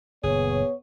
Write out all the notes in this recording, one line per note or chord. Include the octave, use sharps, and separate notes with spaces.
F#1 A#2 B3 G#4 C#5